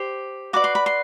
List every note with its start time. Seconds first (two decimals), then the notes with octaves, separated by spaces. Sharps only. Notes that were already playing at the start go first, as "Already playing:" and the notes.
Already playing: G4 C5
0.53 F#4 B4 D5 D6
0.64 C6
0.75 B5
0.86 C6